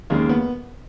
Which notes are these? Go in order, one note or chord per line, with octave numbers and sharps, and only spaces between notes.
D#2 C#3 G#3 A#3
B3